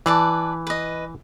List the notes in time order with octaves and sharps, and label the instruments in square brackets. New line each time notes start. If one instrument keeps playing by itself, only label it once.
[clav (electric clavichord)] E3 [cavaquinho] B4 D5 A5
[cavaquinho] B4 D#5